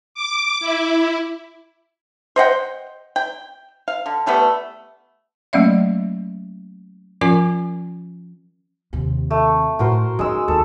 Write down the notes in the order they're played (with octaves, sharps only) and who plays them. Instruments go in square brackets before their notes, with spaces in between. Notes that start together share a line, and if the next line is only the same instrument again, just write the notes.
[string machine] D6
E4
[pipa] C5 D#5 F#5 G5
G5
F5
D3
E3 G3 A3 B3
[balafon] F#3 A3 A#3 C#4 D5 E5
F3 C#4 F4 A#4 G#5 D6
[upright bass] D#2 C3
[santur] A3
[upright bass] A2 [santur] F#4 A#4 C5
[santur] G#3 E6 [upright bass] C#4 D#4
[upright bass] D#2 [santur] A4